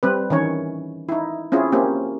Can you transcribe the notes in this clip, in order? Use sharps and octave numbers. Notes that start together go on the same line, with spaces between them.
G3 C4 B4
D#3 E3 C#4 C#5
D#4 E4
C4 C#4 E4 F4 G#4
A#3 C4 C#4 G4